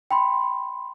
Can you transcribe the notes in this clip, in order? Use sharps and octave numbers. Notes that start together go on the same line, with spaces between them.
G5 B5 C6